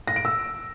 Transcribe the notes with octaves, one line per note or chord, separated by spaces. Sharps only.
A#6
D7
E6